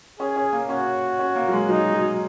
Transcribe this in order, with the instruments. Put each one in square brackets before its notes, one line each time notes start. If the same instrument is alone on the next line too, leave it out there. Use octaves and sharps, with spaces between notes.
[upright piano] C#4 [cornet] G#4
[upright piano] C#4
A#3
[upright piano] C#4 [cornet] F#4
[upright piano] C#4
A#3
F#3
G#3
[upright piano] F#3 [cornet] D#4
[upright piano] F#3